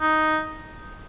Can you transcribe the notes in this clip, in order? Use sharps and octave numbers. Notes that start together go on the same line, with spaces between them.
D#4